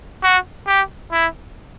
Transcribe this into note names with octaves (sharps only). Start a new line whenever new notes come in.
F#4
G4
E4